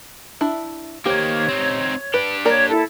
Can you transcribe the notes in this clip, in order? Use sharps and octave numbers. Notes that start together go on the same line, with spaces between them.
D4 E4 E5
D#3 A#3 G4 C5 C#5
C4 D#4
D4 G4 B4
A#3 A#4 C#5 D5
E4 A4